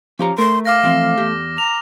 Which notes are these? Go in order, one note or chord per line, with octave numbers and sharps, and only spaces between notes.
F3 C#4 G4 A#5
A3 A#4 C6
F5 D6 F6 A#6
E3 F3 C4
E2 G4
A#5 F7